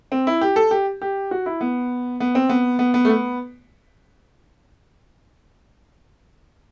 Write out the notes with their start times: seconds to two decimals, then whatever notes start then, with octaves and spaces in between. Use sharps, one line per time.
0.12 C4
0.27 E4
0.41 G4
0.56 A4
0.71 G4
1.01 G4
1.31 F#4
1.46 E4
1.61 B3
2.20 B3
2.35 C4
2.49 B3
2.79 B3
2.94 B3
3.05 A3
3.09 B3